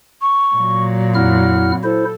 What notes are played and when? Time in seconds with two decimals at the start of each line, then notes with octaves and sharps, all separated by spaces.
0.22 C#6
0.56 A#2 F#3
1.15 F2 E4 F#5 F6
1.83 E4 A4 C5